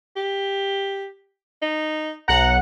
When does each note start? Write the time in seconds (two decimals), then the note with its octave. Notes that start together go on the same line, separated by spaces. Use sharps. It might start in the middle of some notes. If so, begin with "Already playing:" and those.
0.16 G4
1.62 D#4
2.28 B1 F#5 A#5